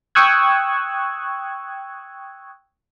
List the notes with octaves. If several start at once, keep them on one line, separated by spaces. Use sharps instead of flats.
G5 C#6 D#6 E6 F#6 G#6